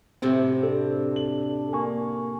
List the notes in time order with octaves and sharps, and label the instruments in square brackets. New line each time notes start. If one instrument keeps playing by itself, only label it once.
[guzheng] A2 C3 F#4 [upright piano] C4
[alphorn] D4 [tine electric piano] A4
[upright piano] F#7
[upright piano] A#3 [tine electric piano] G#5 C#6